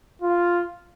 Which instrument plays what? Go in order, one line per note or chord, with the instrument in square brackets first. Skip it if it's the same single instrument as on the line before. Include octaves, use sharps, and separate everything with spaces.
[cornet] F4